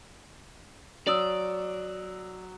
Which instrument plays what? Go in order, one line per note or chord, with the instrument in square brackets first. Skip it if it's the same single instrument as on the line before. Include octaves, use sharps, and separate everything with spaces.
[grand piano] F#3 D#6 E6 [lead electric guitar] D5